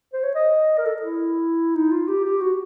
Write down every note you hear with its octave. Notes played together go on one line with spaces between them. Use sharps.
C5
C#5
D#5
A#4
A4
E4
D#4
F4
G4
G4
F#4